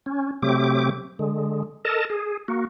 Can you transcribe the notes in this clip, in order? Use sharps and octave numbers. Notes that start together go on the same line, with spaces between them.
C#4
C3 F#3 A3 C4 G4 D6
D3 G#3
A4 A#4 D#5 A5
G#4
A#3 F#4